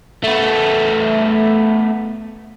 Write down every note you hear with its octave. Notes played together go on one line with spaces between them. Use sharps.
A3 B3